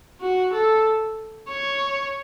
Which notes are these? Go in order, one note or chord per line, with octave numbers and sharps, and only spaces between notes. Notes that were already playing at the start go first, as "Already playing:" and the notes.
F#4
A4
C#5